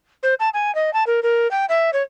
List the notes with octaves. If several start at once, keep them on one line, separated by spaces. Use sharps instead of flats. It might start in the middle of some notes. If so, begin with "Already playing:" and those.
C5
A5
G#5
D#5
A5
A#4
A#4
G5
E5
C#5